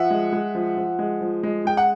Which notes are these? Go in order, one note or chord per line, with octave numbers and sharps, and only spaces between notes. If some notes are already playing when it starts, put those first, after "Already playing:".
Already playing: F3 E5 F#5
G#3
G#3
F3
F3
G#3
F3
G#3
G#3 G5
F#5